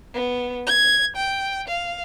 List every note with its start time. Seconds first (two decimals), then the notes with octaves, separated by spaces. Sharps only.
0.14 B3
0.67 G#6
1.16 G5
1.68 F5